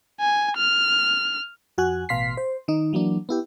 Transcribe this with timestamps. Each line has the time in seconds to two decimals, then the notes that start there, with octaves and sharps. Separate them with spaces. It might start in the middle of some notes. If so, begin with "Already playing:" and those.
0.21 G#5
0.57 F6
1.78 F2 F#4 G#5 F#6
2.09 A1 B2 F5 C6 B6 C7
2.37 C5
2.68 D#3 D#4
2.93 E3 F#3 A#3 D4
3.29 B3 E4 G4